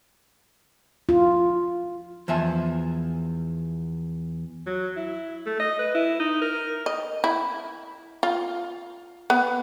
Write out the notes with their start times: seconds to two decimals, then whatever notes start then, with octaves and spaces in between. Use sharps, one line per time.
1.09 F4
2.28 E2 F3 E5 G#5
4.67 F#3
4.96 E4
5.46 A3
5.60 D#5
5.79 B4
5.95 E4
6.20 D#4
6.42 A#4
6.86 D#5
7.24 E4
8.23 F4
9.30 B3